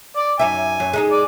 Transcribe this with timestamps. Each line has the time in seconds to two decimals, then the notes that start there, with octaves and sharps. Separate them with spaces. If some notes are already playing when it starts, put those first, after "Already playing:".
0.17 D5
0.39 F#2 D#4 E5 G#5
0.80 F#2
0.93 G#3 D#4 G#4
1.11 D5